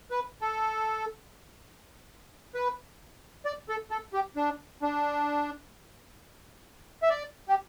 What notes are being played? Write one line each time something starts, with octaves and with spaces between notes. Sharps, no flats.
B4
A4
B4
D5
A4
A4
G4
D4
D4
E5
D5
G4